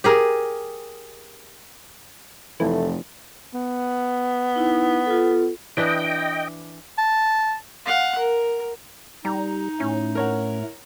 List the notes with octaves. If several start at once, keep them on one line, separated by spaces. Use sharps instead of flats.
G4 G#4 A#4
F1 E3 A3
B3
D#4 E4
F4 A4
E3 D4 B4 D#5 G5
A5
F5 F#5
A#4
G3 D#4 A#5
A2 A3 C#4
A#4 C#5 F#5